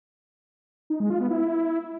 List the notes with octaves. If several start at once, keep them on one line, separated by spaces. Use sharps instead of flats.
D#4
G#3
F4
B3
E4